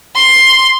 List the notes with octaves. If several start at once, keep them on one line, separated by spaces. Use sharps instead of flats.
C6